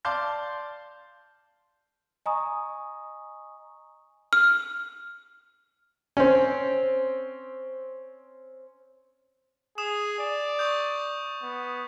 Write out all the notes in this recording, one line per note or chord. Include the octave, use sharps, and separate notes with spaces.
D5 F5 A5 C6 D6 G6
D#5 G#5 A#5 C#6 D#6
F6
C4 C#4
G#4 D#6 E7
D5
C#6 D#6 G6
B3